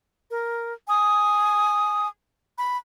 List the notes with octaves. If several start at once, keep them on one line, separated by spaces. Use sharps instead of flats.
A#4
G#5 D#6
B5